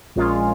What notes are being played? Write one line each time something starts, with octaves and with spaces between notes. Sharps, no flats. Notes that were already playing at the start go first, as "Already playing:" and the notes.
A#1 A#2 G#3 C#4 F4